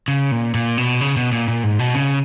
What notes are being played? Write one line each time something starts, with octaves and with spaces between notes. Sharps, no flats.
C#3
A#2
A#2
B2
C#3
B2
A#2
A#2
G#2
B2
C#3